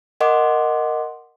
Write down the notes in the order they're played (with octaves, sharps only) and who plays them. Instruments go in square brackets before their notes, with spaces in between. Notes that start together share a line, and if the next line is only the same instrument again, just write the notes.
[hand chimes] A#4 D#5 F#5 C6 D6